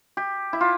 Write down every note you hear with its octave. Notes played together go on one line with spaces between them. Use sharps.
G4
E4
F4